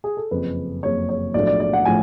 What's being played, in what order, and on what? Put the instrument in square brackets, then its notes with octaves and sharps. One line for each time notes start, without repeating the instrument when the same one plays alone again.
[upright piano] G#4
A4
F#1 F2 C#3 B4
F#1 F2 C#3 C#5
C#5
B1 A2 F3 A3 D4 D5
D5
D5
F#5
A2 F3 G#5